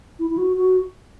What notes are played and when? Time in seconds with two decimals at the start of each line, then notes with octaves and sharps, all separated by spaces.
0.19 E4
0.30 E4
0.38 F#4
0.57 F#4